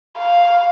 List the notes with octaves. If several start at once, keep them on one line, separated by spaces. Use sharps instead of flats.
F5